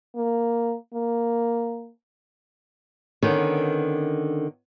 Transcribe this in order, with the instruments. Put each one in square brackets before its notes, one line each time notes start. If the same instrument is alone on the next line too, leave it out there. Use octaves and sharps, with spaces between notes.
[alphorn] A#3
A#3
[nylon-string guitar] D3 D#3 B3 C#4